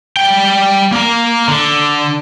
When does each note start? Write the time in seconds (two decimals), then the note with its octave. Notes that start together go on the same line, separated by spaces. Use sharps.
0.17 G3 G5
0.92 A#3 A#5
1.48 D3